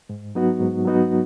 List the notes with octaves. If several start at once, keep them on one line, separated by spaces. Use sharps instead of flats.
G#2
F#3 B3 D#4 F#4
G#2
F#3 B3 D#4 F#4